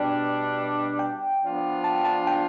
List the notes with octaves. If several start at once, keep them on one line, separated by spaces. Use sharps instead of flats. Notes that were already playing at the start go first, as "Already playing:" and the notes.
Already playing: B2 G3 D4 G5
G5
F3 B3 D4 F4
A5
A5
G5